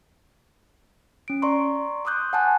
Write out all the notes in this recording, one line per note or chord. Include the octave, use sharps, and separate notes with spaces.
C#4 D7
D5 A#5 C6 C#6
C6 D6 D#6 F#6 G6
F#5 G#5 A5 F#6